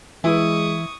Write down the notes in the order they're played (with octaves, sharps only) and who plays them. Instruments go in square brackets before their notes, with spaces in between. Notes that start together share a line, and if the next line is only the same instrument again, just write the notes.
[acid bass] E3 [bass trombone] G#3 [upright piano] E4 [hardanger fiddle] C#6 D#6